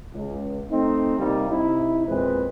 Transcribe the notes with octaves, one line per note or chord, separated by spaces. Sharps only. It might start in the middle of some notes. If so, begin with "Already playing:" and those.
C#2
A3 C4 D#4
C3 G3 A#3 D#4
C3 D#4 E4
E2 A#2 G#3 C4 B4